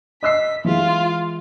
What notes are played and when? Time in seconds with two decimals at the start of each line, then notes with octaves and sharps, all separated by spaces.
0.23 D#5 E6 B6 C7
0.65 E3 G#3 F4